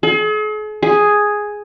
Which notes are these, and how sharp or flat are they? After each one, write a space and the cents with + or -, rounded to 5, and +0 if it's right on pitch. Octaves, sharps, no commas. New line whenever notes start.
G#4 +45
G#4 +0